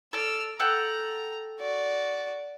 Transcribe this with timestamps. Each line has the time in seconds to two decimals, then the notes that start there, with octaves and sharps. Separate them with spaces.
0.13 A4 D5 E6 F6
0.59 A4 F#5 G5 A#5
1.60 F#4 D5